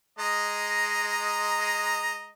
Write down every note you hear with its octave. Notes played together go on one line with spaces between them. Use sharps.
G#3 D#5 A#5